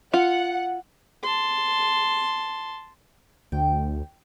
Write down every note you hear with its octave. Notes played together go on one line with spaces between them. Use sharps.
F4 F#5
A5 C6
D2 G5